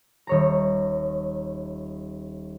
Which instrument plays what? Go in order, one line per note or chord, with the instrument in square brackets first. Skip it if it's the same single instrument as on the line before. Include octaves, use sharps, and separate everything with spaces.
[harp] D#1 C#5 A#5